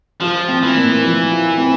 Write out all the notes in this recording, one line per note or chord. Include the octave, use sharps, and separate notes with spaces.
F3 F4
C4
E3
A#2
F3
F4
C4